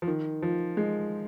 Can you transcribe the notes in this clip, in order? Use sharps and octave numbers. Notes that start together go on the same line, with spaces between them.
F3
D#3
F3
G#3